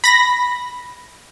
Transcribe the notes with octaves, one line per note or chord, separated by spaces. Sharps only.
B5 A#6